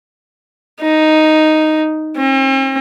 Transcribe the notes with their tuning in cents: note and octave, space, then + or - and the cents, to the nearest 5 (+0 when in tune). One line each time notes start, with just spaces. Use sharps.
D#4 +0
C4 +45